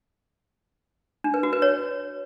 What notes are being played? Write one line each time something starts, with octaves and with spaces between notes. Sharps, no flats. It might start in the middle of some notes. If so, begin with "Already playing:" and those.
D4
B4
F#4
B4
C#5